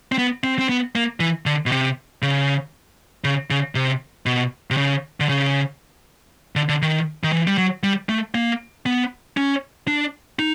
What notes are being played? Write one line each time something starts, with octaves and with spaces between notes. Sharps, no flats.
C4
B3
C4
C4
B3
A#3
E3
D3
B2
C3
C#3
C#3
C#3
C3
B2
C3
C#3
D3
C#3
D3
D3
D#3
D#3
E3
G3
F#3
G3
A3
A#3
B3
C#4
D4
D#4